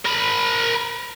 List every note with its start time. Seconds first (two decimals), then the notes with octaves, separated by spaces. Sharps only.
0.05 A#4 B5